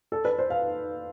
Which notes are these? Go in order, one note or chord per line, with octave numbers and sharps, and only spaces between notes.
A4
B4
C5
F5